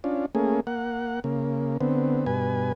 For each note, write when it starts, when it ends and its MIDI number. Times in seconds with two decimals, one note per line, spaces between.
0.04 0.26 61
0.04 0.26 62
0.04 0.26 65
0.35 0.60 57
0.35 0.60 58
0.35 0.60 61
0.35 0.60 68
0.67 1.20 58
0.67 1.20 78
1.24 1.77 49
1.24 1.77 58
1.81 2.25 50
1.81 2.25 59
1.81 2.25 60
2.26 2.72 43
2.26 2.72 47
2.26 2.72 71
2.26 2.72 80